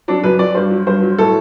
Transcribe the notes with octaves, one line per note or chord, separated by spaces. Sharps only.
F#3 D4
F#2 B4
F#3 D5
G2 C5
F#3
G2 C5
F#3
A2 A4